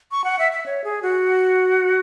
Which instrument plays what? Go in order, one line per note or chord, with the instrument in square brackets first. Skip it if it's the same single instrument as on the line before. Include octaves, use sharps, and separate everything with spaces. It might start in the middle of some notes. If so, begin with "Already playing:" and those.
[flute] C#6
F#5
E5
E5
C#5
G#4
F#4